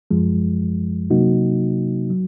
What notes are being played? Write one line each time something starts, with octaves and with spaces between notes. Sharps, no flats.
F#2 F3 G#3
C3 F#3 A#3 D#4 F#4
F#3